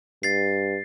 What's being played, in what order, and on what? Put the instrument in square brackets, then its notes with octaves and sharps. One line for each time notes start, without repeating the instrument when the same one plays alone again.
[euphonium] G2 [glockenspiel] A6 C7